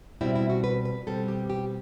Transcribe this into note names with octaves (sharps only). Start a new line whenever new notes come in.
B2 G3 C4 E4
E4
F#4
B4
B4
B2 G3 C4 A4
G4
G4